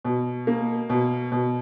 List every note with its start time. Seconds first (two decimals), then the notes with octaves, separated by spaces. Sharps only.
0.05 B2
0.47 A#3
0.89 B2
1.32 B2